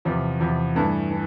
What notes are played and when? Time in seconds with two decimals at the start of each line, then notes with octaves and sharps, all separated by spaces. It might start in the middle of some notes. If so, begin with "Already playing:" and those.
0.05 E2 C3 F3
0.40 E2 C3 F3
0.75 G2 E3 A3
1.11 E3